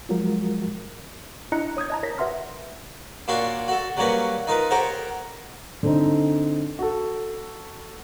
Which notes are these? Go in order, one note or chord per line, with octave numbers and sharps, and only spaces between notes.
F3 F#3 G#3 F4 F#4 A#4
D4 E4 D#5 A#5 F#6 C#7
C#5 D#6 G6 G#6
D#5 A5 A#5
A#4 C#5 A#6 B6
F#4 B4 E5 F#5 C6 F6
A#2 D4 F4 F#4 C#5 C6
F#4 A4
F#3 G3 A#3 C#4 A#4 B4
D#4 F4 A#4 B4
G4 A4 A#4 C5 C#5 F#5
D3 C4 D#4
F#4 A4